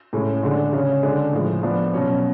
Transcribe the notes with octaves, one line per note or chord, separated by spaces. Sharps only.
A2 G#3 C#4
D3 G#3 D4
C#3 G#3 C#4
D3 G#3 D4
A2 F3 G#3
F3 B3 D4
B2 F#3 C#4